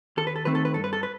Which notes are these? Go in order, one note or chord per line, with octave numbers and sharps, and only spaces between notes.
D#2 A4
B4
A4
D#3 A3 C4 B4
A4
B4
G2 A4
B4
A4
B4